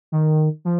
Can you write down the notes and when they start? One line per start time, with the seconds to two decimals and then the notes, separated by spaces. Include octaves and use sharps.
0.12 D#3
0.65 F3